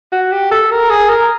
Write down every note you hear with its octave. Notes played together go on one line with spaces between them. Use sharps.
F#4
G4
A4
A#4
G#4
A#4